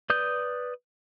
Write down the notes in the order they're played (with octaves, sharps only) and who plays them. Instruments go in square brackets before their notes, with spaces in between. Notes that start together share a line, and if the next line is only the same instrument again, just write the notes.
[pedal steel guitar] B4 D5 D#6 G6